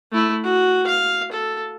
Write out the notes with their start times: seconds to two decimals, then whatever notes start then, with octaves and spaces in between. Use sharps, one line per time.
0.12 A3 E4
0.44 F#4
0.87 F5
1.32 A4